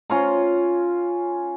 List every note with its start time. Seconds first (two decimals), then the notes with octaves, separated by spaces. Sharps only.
0.10 C#4 F4 A#5